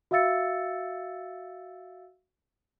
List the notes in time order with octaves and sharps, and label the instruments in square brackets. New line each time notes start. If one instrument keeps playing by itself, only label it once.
[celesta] F#4 E5 F5 E6 A6 C#7